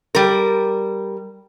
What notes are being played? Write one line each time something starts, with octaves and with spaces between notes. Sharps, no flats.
G3 A#4